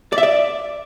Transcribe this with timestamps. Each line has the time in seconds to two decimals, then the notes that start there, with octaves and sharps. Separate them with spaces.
0.12 D5
0.18 E5
0.23 D5